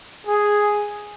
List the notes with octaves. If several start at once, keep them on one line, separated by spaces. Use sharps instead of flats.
G#4